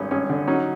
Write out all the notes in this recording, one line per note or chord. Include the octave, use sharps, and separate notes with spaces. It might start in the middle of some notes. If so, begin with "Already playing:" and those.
Already playing: G#1 G2 C#4
G#1 C#4
D3
F#3 C#4 D#4